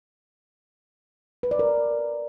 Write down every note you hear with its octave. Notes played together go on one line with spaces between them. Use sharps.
B4
D5
A#4